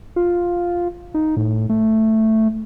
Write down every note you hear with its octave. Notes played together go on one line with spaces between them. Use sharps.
F4
D#4
A2
A3